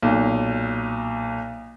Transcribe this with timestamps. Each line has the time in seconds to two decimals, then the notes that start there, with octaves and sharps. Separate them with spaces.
0.02 B1 A#2